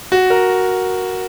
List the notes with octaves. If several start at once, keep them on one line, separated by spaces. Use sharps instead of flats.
F#4
A#4